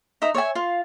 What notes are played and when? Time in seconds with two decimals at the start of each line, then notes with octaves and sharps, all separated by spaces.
0.22 D#4 E5 A#5 D#6
0.34 C#5 D5 E5 G#5
0.55 F4 F5